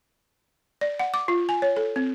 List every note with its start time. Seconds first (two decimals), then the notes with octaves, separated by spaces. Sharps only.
0.81 D5
0.99 F#5
1.14 D6
1.28 F4
1.49 G#5
1.62 C#5
1.76 A4
1.96 C4